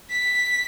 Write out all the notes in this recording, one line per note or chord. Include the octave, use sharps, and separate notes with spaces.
B6